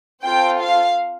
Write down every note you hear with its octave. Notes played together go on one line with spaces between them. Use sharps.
C4 F4 A4 G5
F5